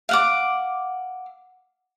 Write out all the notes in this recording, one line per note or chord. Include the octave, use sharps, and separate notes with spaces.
F5 F#5 D6